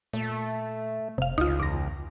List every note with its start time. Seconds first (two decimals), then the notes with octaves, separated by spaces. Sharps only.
0.13 A#2 A3
1.18 F1 C3 F5
1.38 C#2 D#4 F4
1.60 E2 D6 A#6